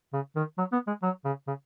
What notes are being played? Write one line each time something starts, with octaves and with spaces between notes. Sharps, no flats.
C#3
D#3
F#3
B3
G#3
F#3
C#3
C#3